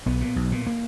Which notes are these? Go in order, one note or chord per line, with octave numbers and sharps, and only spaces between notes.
B1 B3
A#2
B1
A#2
A#3